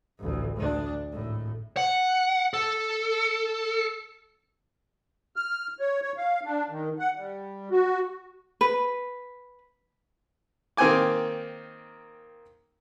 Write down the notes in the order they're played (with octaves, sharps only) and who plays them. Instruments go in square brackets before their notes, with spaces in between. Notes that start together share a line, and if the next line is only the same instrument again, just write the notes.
[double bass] A1 D2
D2 D4
G#1 A2
[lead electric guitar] F#5
A4
[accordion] F6
C#5
C#5
F5
D4
D#3
F#5
G3
F#4
[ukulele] B4
[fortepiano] D#3 A#3 C4 G5 G#5 D6